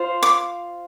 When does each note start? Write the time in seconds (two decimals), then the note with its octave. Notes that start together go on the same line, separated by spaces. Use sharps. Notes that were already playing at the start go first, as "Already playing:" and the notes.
Already playing: F4 C5
0.23 D6